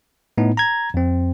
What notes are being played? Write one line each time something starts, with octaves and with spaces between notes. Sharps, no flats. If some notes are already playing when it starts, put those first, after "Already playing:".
A2 B3 D#4
A#5 G#6
F2 C4